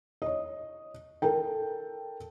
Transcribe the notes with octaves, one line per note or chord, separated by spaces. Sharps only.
C#5 D#5
A4 A#4 G5